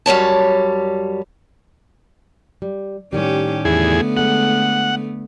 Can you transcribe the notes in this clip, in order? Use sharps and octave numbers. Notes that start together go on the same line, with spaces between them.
F#2 G3 C#5 A5
G3
A2 D#3 G3 C#4 G4
E2 D3 A3 B3 G#4
G#3 A4 F#5